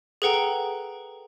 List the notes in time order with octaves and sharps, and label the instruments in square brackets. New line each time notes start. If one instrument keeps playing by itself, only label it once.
[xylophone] G#4 A4 B4 F#5 G5 A#5